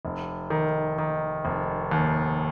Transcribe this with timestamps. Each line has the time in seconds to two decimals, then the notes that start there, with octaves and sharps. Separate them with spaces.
0.05 F1
0.50 D#3
0.98 D#3
1.45 F1
1.91 D#2